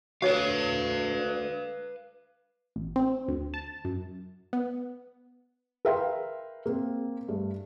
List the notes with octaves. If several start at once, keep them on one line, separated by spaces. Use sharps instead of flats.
D2 F#4 B4 C#5 F5
A1
C4
D2
A5
F#2
B3
A#4 B4 E5 F5 G5 C6
A#3 C4
G2 A3